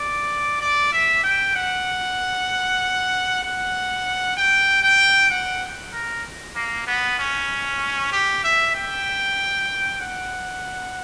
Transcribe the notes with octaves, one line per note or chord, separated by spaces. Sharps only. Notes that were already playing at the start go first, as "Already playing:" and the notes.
Already playing: D5
D5
E5
G5
F#5
F#5
G5
G5
F#5
A#4
A#3
B3
C#4
G4
E5
G5
F#5